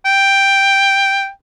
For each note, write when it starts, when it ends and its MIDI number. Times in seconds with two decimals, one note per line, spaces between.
0.06 1.29 79